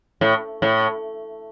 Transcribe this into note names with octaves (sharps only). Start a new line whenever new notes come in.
A2
A2